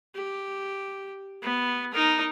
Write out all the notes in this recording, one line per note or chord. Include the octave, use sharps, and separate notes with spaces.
G4
B3
D#4 A#4